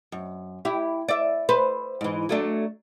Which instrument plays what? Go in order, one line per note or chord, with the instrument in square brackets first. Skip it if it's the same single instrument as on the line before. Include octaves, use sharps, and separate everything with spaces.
[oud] F#2
E4 G4
D5 E5
B4 C5
G#2 E3
F#3 A3 D4